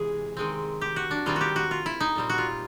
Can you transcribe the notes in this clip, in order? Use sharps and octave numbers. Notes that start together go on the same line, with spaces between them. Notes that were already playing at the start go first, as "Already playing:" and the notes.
Already playing: C3 E3 G#3 G#4
D#3 G#3 C4
G4
F#4
D4
D#3 G3 C4 F4
F#4 G4
F#4
F4
E4
D#4
A#2 G3 C4
F#4
F4